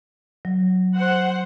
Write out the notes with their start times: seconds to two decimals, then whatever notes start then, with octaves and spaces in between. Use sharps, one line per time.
0.45 F#3
0.96 C5 F#5